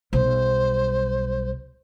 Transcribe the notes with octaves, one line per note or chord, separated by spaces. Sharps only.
B1 G3 C5